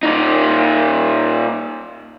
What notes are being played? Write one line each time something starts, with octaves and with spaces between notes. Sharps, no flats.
A#2 D#4